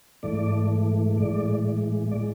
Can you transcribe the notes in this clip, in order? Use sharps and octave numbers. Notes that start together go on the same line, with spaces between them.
G#2 E3 A3 D5
A2 E3 G#3 D5
G#3 D5